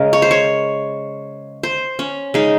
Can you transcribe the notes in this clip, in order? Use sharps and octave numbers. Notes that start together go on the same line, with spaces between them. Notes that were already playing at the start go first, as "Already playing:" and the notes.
Already playing: C#3 G#3 A#4
C#5
C5
C#5
C5
C#4
C#3 G#3 D#4